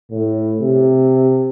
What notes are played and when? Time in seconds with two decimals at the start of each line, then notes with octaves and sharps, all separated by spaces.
0.10 A2
0.61 C3